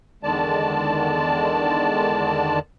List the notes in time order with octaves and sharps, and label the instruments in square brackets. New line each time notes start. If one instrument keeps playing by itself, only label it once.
[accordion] E2 D3 D#3 G#3 D5 A5